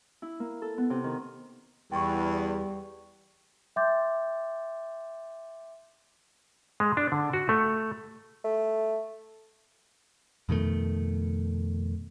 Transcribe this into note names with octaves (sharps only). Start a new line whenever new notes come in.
E4
A#3
A4
B3
C3
D#3
E2 G3 G5 C#6
E5 G5 C6 D6 G6 A6
G#3
D4
D3
F#4
A3
A3
F2 B2 D#3 A3